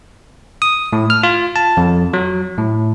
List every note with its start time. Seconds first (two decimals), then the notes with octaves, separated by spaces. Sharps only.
0.62 D#6
0.93 A2
1.10 F6
1.23 F4
1.56 A5
1.77 F2
2.13 F#3
2.58 A2